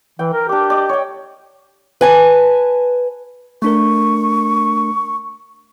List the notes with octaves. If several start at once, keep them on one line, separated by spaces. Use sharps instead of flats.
E3 G5
A#4
D4 G4 D6
D5 D#5
C#5 G5
B4 G#5 A5
A3 D4 A#4 C#6